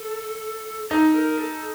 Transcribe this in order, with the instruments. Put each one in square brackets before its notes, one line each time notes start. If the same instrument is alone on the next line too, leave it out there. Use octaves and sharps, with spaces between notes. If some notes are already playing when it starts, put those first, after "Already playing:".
Already playing: [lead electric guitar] A4
[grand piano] D#4 [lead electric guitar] A4
[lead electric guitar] A#4
A4